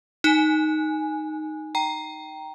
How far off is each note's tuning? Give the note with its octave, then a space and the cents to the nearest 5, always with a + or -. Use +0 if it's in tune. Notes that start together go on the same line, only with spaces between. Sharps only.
D#4 +0 G#5 +0
G5 -5 A#5 +0